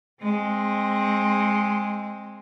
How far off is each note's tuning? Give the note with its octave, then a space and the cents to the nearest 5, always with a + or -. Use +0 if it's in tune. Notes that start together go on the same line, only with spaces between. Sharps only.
G#3 +0 C4 +15